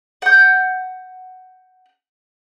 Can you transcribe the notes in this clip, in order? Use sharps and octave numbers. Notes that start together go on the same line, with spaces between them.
F#5 G6